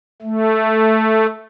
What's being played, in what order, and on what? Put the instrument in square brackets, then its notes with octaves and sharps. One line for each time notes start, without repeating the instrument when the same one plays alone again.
[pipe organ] A3